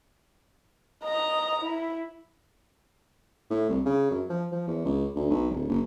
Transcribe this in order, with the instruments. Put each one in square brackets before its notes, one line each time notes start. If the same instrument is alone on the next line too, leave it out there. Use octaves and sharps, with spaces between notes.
[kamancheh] D#5 A#5
E4
[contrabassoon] A2
C2
C#3
F#2
F3
F3
E2
C#2
D2
B1
D1
F#1